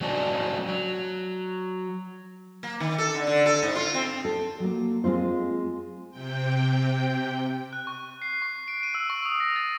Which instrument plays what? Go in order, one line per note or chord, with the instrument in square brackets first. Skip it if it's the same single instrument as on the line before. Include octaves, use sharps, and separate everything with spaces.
[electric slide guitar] F#3 G#3 C#4 D4
F#3
[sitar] A#3
D#3
A4
D3
D3
A4
G#2
F4
C4
[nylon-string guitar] A4
F#3 A#3
G#3 C4 F4 C5
[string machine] C3 G5
[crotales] F#6
C#6
C7
C#6
D7
D#7
E6
C#6
D#6
A#6
A6